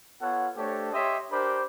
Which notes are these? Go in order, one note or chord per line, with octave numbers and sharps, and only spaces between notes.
B3 F4 A4 C#5 F#5
A3 D4 G4 A4 C5 C#5
G4 C#5 D#5 E5 C6
D4 G4 A#4 C5 B5 D6